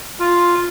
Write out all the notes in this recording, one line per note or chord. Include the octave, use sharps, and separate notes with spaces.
F4